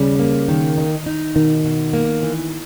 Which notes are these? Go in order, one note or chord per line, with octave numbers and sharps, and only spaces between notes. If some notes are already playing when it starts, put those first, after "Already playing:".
Already playing: D#2 C#3 G3
A#3
D#3
D#4
D#4
B2 D#3
B2
A#3
E3